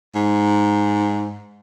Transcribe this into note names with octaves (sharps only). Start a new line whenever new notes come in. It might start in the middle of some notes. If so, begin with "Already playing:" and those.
G#2